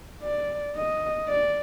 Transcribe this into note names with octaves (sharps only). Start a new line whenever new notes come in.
D5
D#5
D5